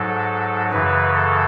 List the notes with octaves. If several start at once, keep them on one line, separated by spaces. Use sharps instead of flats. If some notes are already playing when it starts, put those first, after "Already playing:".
Already playing: G#2 F#3 A4
F#2 C#3 E3 B4
A4